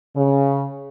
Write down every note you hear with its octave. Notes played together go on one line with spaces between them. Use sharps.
C#3